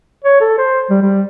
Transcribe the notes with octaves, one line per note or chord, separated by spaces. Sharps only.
C#5
A4
C5
G3
G3